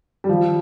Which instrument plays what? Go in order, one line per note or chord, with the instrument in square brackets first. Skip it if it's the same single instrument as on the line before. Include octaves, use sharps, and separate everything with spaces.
[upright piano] G3
[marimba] D#3 [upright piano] F3